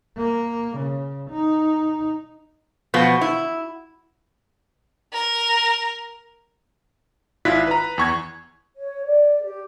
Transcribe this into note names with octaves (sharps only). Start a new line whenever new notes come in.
A#3
C#3
D#4
B2 F3 B3
E4
A#4
G#1 E4 F4 F#6 B6
B4 A#5
E2 C#6 G#6
C#5
D5
G4